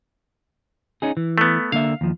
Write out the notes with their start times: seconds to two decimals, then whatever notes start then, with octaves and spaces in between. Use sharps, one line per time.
1.02 C#4 D#4 G#4
1.17 E3
1.38 A3 B3
1.72 D3 A#3 E5 F5
2.01 D#2 F3